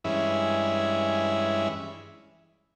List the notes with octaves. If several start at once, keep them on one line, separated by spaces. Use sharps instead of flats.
G2 E3 G#3 C#4 E4